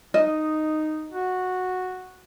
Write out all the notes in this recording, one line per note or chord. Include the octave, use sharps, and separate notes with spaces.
D#4 D#5
F#4